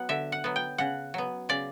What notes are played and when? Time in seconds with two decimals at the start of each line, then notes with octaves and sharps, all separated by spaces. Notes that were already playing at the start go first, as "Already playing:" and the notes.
Already playing: F#3 B3 F#5
0.09 D3 E5
0.32 F#5
0.44 F#3 B3
0.56 G5
0.78 C#3 F#5
1.14 F#3 B3
1.49 C#3 D5